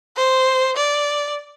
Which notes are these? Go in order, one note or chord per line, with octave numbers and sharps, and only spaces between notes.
C5
D5